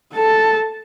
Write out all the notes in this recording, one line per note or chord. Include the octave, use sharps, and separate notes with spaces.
A4 A5